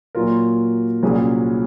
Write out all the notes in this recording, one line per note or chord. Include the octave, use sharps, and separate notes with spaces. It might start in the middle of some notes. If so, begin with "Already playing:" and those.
A#2 F#3 A#3 F4 A#4
C2 A#2 F#3 C#4 G#4